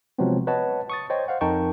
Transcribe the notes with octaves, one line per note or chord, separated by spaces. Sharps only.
C3 F3 F#3 G#3 B3 C4
B4 C#5 D#5 F#5 A5
C#6 D#6 A6
C5 C#5 D#5 G5
C5 F5 F#5
F2 D#4 A#4 G5 A5 C#6